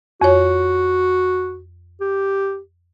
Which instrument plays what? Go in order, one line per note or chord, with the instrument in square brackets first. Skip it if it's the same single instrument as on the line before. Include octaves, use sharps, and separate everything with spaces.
[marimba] F2 C#5 [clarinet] F#4
[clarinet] G4